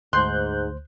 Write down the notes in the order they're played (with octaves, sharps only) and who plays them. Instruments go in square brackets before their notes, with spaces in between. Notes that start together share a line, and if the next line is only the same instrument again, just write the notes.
[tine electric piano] D2 C5 [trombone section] G#2 [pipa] C6 [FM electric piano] F#6 G6